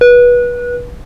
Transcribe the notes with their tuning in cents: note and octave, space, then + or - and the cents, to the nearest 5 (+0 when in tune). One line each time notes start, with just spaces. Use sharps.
B4 -25